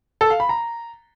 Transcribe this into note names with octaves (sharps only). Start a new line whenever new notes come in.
A4
F5
B5
A#5